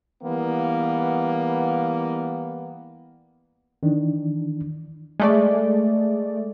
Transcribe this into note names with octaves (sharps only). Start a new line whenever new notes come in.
E3 G3 A#3 B3
D#3 E3 D4
G#3 A3 D5